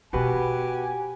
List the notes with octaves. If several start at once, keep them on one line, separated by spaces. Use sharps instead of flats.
B2 B3 F#4 G4 B4 G#5